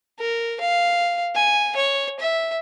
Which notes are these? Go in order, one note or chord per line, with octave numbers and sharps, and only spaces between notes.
A#4
F5
G#5
C#5
E5